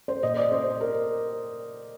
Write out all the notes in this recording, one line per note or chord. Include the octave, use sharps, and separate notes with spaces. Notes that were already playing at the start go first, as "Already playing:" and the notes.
C5
A#2 D#5
D5
C5
A#4